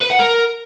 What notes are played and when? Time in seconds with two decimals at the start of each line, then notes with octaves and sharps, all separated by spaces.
0.02 B4
0.11 F#5
0.20 A#4